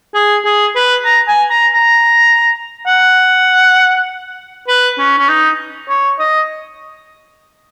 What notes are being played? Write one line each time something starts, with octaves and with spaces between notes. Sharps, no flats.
G#4
G#4
B4
A#5
G#5
A#5
A#5
F#5
B4
C#4
C#4
D#4
C#5
D#5